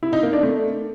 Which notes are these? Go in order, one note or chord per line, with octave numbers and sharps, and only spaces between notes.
E4
D#4
A#3
D4
A3